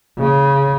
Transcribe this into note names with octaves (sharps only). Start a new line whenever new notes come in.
C#3